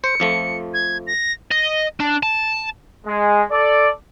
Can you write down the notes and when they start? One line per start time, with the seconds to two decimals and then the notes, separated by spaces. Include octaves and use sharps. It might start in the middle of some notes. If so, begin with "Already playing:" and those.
0.04 C5 C#7
0.20 F2 F3 A3
0.74 G#6
1.07 A#6
1.51 D#5
2.00 D4
2.23 A5
3.07 G#3
3.51 A4 D5